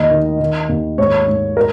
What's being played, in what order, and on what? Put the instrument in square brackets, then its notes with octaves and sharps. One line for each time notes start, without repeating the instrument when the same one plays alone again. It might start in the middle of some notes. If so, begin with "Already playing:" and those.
Already playing: [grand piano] D#2 D#5
D#3
D#3
D#2
G#2 C#5
G#2
A#4